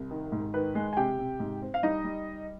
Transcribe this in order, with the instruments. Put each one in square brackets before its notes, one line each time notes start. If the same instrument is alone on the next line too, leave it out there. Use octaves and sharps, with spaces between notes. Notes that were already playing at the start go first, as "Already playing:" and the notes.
Already playing: [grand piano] C2
D#3
G#2
[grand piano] D#3 [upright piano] B4
[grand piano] G#3
[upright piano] G#5
[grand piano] C3 [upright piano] G4 G5
[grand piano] C3
G#2
C4
[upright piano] F5
[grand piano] G3 [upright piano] D#4 D#5
[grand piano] G3